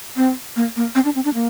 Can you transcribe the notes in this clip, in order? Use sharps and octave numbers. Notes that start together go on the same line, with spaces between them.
C4
A#3
A#3
C4
D4
C4
D4
A#3